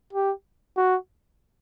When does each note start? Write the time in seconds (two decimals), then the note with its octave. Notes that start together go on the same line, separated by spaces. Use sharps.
0.13 G4
0.77 F#4